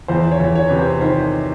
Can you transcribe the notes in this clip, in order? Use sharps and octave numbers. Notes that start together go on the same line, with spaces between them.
E2 C5
C#5
E2
C#5
C3 B4
C5
D#3 C5